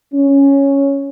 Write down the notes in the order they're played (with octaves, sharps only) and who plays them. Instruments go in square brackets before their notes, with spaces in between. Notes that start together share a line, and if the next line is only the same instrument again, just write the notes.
[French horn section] C#4